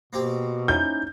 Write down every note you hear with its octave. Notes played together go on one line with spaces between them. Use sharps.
B2 A#3 C4 G4
C#4 D#4 E4 G6